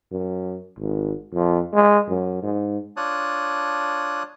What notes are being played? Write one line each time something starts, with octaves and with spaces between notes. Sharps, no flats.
F#2
G#1
F2
G#3
F#2
G#2
D4 F4 C#5 A5 D#6 F#6